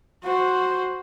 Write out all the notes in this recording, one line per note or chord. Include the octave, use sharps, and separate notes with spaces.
F#4 C5